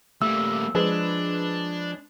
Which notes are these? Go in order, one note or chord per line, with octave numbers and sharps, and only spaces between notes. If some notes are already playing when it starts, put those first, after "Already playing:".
G3 A3 A#3 E6
F3 G#3 D4 B4